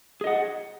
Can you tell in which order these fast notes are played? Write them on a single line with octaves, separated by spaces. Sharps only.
G#4 D#5 F#5